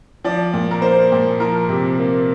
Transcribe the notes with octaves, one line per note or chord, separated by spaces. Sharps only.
F3 D5
A#2
A#4
A#3 C5
A#2
F3 A#4
C3
A#3